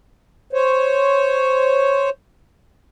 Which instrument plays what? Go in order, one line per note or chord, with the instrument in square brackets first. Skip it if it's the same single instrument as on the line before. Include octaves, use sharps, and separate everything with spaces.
[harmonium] C5 C#5